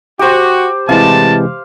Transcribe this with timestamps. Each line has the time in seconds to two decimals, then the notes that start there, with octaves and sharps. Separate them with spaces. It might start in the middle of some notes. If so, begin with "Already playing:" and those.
0.19 F#4 G4 C5
0.89 A2 C3 E3 G#3 F5 A5